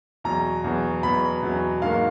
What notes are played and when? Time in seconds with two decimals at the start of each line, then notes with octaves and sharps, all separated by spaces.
0.24 E2 B2 F#3 A#5
0.64 E2 B2 F#3
1.03 E2 B2 F#3 B5
1.43 E2 B2 F#3
1.82 G#2 D#3 F#3 A#3 F5